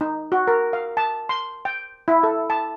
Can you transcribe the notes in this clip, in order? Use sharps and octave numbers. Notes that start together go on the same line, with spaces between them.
D#4
F#4
A#4
F5
A5
C6
G5
E4
A4
A5